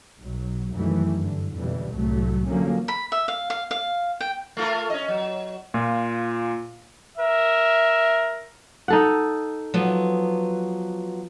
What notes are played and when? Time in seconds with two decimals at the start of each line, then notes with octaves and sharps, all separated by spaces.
0.18 B1 F#3
0.74 F#2 D#3 E3 F#3 G3 A3
1.16 G2 D3
1.55 F2 G#2 B2 D3 E3 G3
1.91 C2 A2 C3 F#3 A3
2.47 D3 F3 F#3 A3 A#3 C#4
2.88 B5
3.12 E5
3.28 F5
3.50 F5
3.71 F5
4.21 G5
4.57 A3 F4 A#4
4.90 C#4 D#5
5.08 F#3
5.74 A#2 F4
7.18 A#4 E5
8.88 D#4 A4 F#5
9.74 F3 F#3 B3